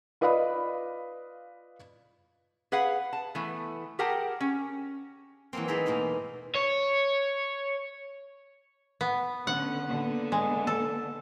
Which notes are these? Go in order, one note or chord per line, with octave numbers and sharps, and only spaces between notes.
F4 B4 D5 D#5 F5 B5
G#4 B4 F5 F#5
A5
E3 A3 B3
G4 G#4 A#4 F#5 G5 A5
C#4
E3 F#3 G#3 A#3 C4
E3 C4 D#4 G#4 A#5 B5
E2 G#2 B2 A3 A#3 A#5
C#5
B3
D3 B3 C#4 F#5
D3 A#3 B3
G#3
A4